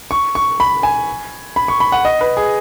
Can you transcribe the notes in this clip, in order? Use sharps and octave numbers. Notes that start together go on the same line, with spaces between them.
C#6
C#6
B5
G#5
B5
C#6
B5
F#5
D#5
B4
G#4